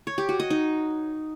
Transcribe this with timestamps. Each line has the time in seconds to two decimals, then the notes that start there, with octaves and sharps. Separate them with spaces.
0.07 C#5
0.18 G4
0.29 F#4
0.40 D#5
0.50 D#4